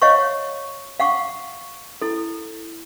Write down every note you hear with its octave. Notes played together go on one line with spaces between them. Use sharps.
C#5 D#5 F5 F#5 C#6
F5 F#5 C#6 D6
E4 A4